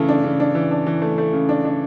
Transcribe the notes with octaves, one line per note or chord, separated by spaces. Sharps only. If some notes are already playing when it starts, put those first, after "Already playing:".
Already playing: C#3 E3 A3
D4
C#3
D4
E3
D4
E3
A3
A3
C#3
D4
D4